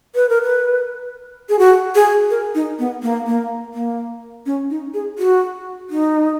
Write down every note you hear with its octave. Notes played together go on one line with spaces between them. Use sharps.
B4
A#4
B4
G#4
F#4
G#4
A#4
D#4
B3
A#3
A#3
A#3
C#4
D#4
G#4
F#4
D#4